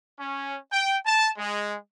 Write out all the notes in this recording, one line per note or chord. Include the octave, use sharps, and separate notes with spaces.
C#4
G5
A5
G#3